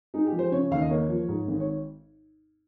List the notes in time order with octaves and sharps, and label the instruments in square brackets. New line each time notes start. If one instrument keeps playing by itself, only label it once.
[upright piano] G#3 D#4
G4
F3
C5
C#3 C#5
D#2 F5
D#5
A#3 C#5
F3
G#2
G#1
C#5